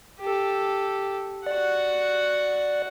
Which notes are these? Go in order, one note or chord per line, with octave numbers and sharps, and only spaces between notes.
G4 A4
F#4 D5 F#5